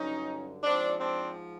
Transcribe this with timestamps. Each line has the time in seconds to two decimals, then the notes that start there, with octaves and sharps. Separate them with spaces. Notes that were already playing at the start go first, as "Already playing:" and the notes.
Already playing: G2 D3 F#3 C#4 D#4
0.64 G#2 F3 C4 D4
0.98 C4 D4